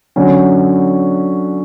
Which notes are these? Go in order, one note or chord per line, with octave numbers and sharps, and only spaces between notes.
D3 F#3 C#4